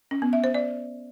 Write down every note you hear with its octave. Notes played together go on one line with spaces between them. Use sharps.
C#4
B3
E5
C5
D5